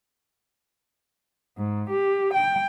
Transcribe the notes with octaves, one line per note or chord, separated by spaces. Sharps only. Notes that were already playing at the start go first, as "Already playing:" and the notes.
G#2
G4
G5